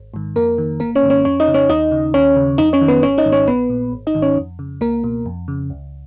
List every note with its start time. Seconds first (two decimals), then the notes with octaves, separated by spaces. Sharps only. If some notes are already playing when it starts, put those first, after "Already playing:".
Already playing: G#1
0.14 G#2 D#3
0.36 F2 A#3 A#4
0.58 D#3
0.80 G#1 A#3 A#4
0.95 C#4 C#5
1.03 G#2 D#3
1.10 C#4 C#5
1.25 F2 C#4 C#5
1.40 D#4 D#5
1.48 C#3
1.54 C#4 C#5
1.69 D#2 D#4 D#5
1.92 C#3
2.14 D#2 C#4 C#5
2.36 C#3
2.58 F2 D#4 D#5
2.73 C#4 C#5
2.81 D#3
2.88 B3 B4
3.03 G#1 C#4 C#5
3.18 D#4 D#5
3.26 G#2 D#3
3.32 C#4 C#5
3.48 A#1 B3 B4
3.70 A#2
3.92 G#1
4.07 D#4 D#5
4.15 G#2 D#3
4.22 C#4 C#5
4.37 F2
4.59 C#3
4.81 C#2 A#3 A#4
5.04 B2
5.26 F2
5.48 C#3
5.70 C#2